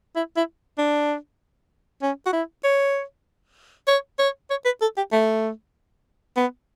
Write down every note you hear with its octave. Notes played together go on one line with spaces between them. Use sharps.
E4
E4
D4
C#4
F#4
E4
C#5
C#5
C#5
C#5
B4
A4
G4
A3
B3